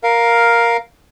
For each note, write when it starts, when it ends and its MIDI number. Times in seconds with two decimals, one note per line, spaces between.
0.04 0.77 70
0.04 0.77 77